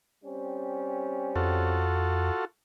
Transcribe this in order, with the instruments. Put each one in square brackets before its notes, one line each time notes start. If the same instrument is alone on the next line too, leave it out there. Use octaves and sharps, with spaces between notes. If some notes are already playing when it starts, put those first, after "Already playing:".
[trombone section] G3 C4 C#4
[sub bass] F2 [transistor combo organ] F4 F#4 A4